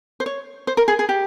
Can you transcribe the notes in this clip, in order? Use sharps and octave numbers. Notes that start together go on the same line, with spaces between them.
C5
C#5
C5
A#4
G#4
G#4
G4